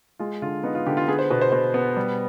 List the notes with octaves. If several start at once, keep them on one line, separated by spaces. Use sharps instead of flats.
G#3 F4
D3 F4
B3 D#4
F4
D3 G4
F4
B3 G#4
C5
B2 B4
C5
B2 C5
B3
G3